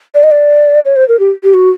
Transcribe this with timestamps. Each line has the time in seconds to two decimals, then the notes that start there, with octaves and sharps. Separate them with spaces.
0.14 D5
0.23 D#5
0.31 D5
0.85 C#5
0.96 C5
1.08 A#4
1.19 G4
1.43 G4
1.54 F#4